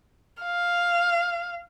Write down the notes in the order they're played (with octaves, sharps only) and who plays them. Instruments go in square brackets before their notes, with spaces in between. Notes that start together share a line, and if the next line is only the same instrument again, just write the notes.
[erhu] F5